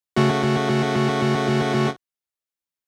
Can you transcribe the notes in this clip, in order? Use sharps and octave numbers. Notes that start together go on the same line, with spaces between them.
C#3 A3 F#4